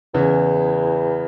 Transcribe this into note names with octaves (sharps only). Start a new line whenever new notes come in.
E2 C#3 E3